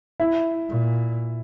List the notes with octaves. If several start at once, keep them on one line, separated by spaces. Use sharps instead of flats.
E4
A#2